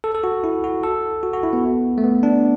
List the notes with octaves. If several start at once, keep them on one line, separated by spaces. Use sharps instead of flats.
A4
A4
F#4
E4
F#4
A4
F#4
F#4
E4
B3
A3
B3
D4